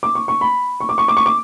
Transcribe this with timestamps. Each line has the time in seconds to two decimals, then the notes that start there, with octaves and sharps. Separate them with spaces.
0.03 D6
0.15 C#6
0.28 C#6
0.41 B5
0.80 C#6
0.89 D6
0.98 C#6
1.08 D6
1.17 C#6
1.26 D6